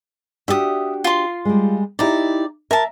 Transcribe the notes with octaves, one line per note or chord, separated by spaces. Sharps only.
D4 F#4 G4 E5 D#6
F4 C6
G3 G#3
D#4 E4 G4 D5 A#5
A#4 E5 A5